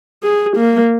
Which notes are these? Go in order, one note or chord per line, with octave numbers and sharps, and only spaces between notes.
G#4
A#3